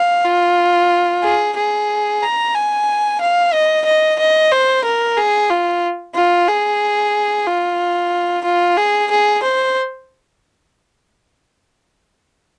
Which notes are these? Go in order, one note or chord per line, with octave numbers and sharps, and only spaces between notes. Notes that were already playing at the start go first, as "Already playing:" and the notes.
Already playing: F5
F4
G#4
G#4
A#5
G#5
F5
D#5
D#5
D#5
C5
A#4
G#4
F4
F4
G#4
F4
F4
G#4
G#4
C5